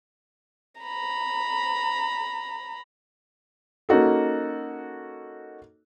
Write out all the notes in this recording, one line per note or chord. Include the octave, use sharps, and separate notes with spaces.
A#5 B5
A#3 C#4 D#4 F#4 A4